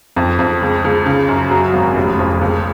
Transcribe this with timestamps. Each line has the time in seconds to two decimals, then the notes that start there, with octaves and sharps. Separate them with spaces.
0.16 F2
0.39 F2
0.62 C#2
0.85 C#2
1.06 C#3
1.29 F#2
1.51 F#3
1.73 G#1
1.96 F1
2.19 F2
2.41 C#2